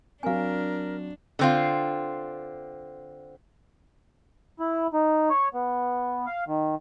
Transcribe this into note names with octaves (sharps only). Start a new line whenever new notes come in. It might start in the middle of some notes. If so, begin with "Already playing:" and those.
F#3 C4 D4 A#4 F5 G#5
D3 C4 F4
E4
D#4
C#5
B3
F5
D#3